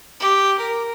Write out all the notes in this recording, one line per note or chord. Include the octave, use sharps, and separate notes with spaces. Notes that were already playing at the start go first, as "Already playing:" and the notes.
G4
A#4